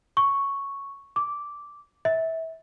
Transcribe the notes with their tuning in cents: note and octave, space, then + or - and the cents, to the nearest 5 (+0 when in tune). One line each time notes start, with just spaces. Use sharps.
C#6 +0
D6 -10
E5 -25